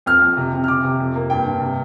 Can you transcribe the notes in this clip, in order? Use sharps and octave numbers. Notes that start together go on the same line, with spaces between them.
F2 F6
F2
C3
C3
F6
C3 D6
C3
F2
A#3
G2 G5
G2
C3